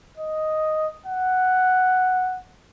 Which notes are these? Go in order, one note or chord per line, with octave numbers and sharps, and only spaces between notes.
D#5
F#5